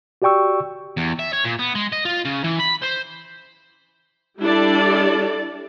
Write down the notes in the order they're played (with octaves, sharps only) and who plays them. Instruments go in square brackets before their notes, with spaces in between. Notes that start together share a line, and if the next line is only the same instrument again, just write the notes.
[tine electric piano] F#4 G4 D5 G5 C#6 E6
[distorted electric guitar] E2
E5
C#5
A#2
B3
G#3
D#5
F4
C#3
E3
B5
C5
[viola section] G3 D4 E4 G4 A4 D5